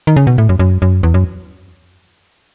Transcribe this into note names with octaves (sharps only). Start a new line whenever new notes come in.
D#3
C#3
B2
A2
F#2
F#2
F#2
E2
F#2